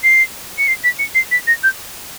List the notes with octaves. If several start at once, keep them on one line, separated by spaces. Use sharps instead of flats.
C7
C#7
C7
B6
C#7
C7
B6
A#6
G6